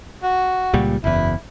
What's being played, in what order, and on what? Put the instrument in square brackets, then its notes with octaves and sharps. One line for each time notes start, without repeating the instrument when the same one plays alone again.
[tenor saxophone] F#4
[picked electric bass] C#2 A#2 G3
[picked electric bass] F#1 E2 [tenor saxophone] E4